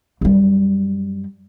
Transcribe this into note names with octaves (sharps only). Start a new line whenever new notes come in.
F#2 G3